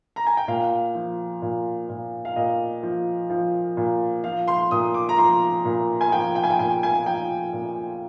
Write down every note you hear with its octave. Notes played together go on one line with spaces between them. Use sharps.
A#5
G#5
G5
A#2 F5
F3
A#2
A#2
F5
A#2 D#5
F3
F3
A#2
F3 F5
C6
A#2 D#6
D6
A#5
F3 C6
A#2
G#5
F3 G5
G5
G#5
G5
A#2 G#5
G#5
F3 G5
A#2